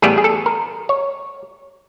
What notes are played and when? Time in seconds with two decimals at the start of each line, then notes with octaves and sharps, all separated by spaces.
0.02 A2 E3 G3 B3 G#4
0.18 G#4
0.24 A4
0.46 A#4
0.89 C#5